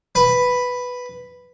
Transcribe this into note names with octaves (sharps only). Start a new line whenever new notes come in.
B4